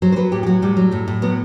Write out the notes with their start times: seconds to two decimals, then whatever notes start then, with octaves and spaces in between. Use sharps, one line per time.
0.02 F#3 C5
0.12 C5
0.16 F#3 B4
0.32 A2 G4
0.43 G4
0.46 F#3 F#4
0.62 A2 G3
0.77 F#3
0.92 A2 A3
1.07 A2
1.22 F#3 B3